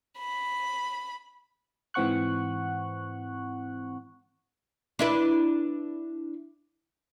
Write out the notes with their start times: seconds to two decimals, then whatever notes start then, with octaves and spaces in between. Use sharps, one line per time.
0.18 B5
1.94 G#2 E3 C4 F#5 C#6 F#6
4.99 D4 E4 B4